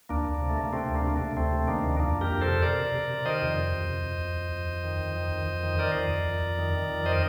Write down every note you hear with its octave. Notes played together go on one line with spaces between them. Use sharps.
D2 A#3 D4
D2
C3
A3
C3 A#3
C3 A3 C4
D2
A#3 D4
C3 A#3
C3 A3
D2 A3 C4
C3
D#3 A#3 D4
D2
F2 A#3 D4
F2
G4 A#4
F2
A4 C5
C3
C3 A#4 D5
C3
C3
C3
D#3 C5 D#5
F2
C3
F2
F2
F2
F2
F2
F2
F2
D#3
F2
D#3
F2
F2
D#3
D#3 A#4 D5
F2
F2
F2
F2
D#3
D#3
F2
D#3 C5 D#5